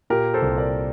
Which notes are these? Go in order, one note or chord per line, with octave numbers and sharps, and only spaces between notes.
A#2 G4 A#4
A4 C5
C2
A#4 D5